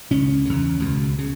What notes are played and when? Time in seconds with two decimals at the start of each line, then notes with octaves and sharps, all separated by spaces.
0.11 C#2 C#3 C#4
0.45 E2 C#3
0.80 C#2 B2
1.18 C#3